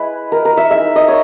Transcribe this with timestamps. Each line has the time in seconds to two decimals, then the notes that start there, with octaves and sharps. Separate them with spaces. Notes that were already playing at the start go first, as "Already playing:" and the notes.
Already playing: G#3 E4 B4
0.32 A#4
0.45 A#4
0.57 E5
0.70 G#3 D#4 E5
0.96 D#5
1.08 C#5